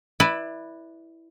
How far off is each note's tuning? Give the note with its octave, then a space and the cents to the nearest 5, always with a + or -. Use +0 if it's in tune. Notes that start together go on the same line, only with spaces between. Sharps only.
E4 +0 B4 +0 D5 +25